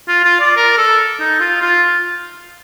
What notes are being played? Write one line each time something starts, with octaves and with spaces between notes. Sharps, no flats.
F4
F4
D5
A#4
A4
D#4
F4
F4